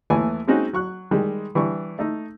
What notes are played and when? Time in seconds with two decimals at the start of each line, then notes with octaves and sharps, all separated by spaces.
0.10 D#2 E3 A3 G#5
0.48 G#3 C4 C#4 D#4 F#4 G#4
0.73 F#3 C#6 F#6
1.11 D#3 G3 G#3
1.55 E3 G3 D4 C#6
1.99 A3 D#4